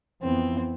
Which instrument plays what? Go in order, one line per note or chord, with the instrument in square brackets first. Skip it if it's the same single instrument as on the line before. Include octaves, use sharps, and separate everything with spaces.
[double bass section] F2 E3 B3 [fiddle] C4